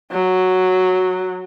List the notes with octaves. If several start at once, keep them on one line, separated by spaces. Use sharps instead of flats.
F#3